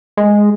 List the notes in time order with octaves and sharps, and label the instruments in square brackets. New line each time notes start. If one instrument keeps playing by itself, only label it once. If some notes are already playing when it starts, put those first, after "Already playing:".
[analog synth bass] G#3